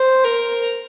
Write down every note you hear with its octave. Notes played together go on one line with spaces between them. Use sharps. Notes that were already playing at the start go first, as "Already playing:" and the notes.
Already playing: C5
A#4